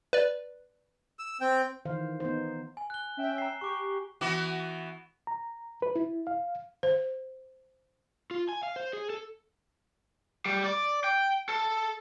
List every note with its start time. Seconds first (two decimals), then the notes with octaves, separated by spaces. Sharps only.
0.13 B4 D5
1.19 E6
1.41 C4 G5
1.85 D#3 E3 C5 F5
2.20 B3 D#4 C5
2.77 G#5
2.90 F#6 G7
3.17 C#4 E5 G5
3.38 A#5 C7
3.61 G4 C#6 D6
4.21 E3 B3 F#4
5.27 A#5
5.82 B4
5.95 E4
6.27 F5
6.83 C5
8.31 F4
8.49 G#5
8.63 F5
8.76 C5
8.93 G#4
9.10 A4
10.46 G3
10.64 D5
11.04 G5
11.49 A4